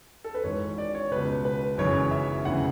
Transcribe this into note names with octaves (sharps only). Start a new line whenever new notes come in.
A4
B4
G#1 G#2 E3 C#5
D5
C#5
C#2 B2 B4
B4
G#1 F#2 C#3 E3 C#5
E5
E1 D2 C#3 E3 F#5